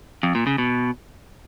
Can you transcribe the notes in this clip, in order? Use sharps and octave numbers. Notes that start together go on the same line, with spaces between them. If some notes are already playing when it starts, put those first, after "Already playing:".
F2
A#2
C#3
B2